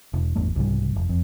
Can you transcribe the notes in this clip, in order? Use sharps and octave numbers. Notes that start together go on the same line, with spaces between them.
E1
D1 G1 E2 A3
C2 G#2 C#3 G3
F1
F2